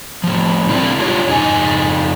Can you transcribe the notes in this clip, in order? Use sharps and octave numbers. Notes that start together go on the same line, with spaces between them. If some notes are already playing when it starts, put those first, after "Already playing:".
A2 F3
C4 D4 E4 A#4 B4 D5
D4 F4 G4 C#5
F2 D#4 D#5 G#5